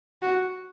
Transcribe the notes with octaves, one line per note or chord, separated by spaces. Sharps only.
F#4